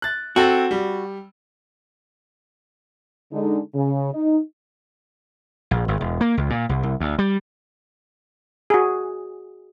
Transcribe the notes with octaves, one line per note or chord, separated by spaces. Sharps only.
F#6 A6
C4 F#4 A4
G3
D3 G#3 D#4
C#3
D#4
A#1
G#1
E1
A#3
C#2
A#2
C2
C2
D2
G3
F#4 G#4